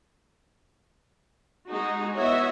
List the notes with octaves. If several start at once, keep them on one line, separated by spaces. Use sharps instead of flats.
G#3 D#4 F#4 G#4
B3 E4 F#4 C#5 D#5 E5